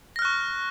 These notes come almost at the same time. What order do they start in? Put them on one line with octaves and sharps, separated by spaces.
A#6 F6 F#6 C#6